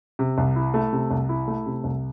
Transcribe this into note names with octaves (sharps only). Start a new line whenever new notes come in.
C3
C2
E4
A3
C3
C2
E4
A3
C3
C2